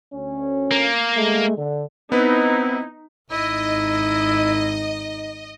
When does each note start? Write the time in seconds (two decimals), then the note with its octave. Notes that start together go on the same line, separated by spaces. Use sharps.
0.14 D2 C#4
0.71 A#3
1.17 G#3 A3
1.57 D3
2.12 B3 C4 D#4 E4 B4
3.31 G#1 D#4 E4 D#5